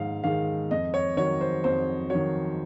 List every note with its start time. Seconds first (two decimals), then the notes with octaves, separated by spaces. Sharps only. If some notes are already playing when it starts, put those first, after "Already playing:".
Already playing: G#2 D#3 G#3 F5
0.24 D#3 G#3 F5
0.71 F2 D#5
0.94 C#5
1.17 D#3 F#3 C#5
1.41 C5
1.64 F2 C5
2.10 F#3 C#5
2.15 D#3